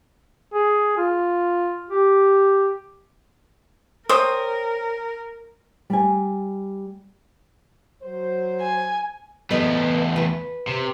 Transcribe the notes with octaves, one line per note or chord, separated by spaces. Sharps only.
G#4
F4
G4
A#4 C5 C#5 G5 D#6
G3 G#5
F#3 C5
G#5
E2 A3 B3 B4 D#5
B4
C3